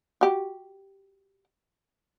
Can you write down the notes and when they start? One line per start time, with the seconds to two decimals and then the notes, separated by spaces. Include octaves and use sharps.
0.21 F#4 G4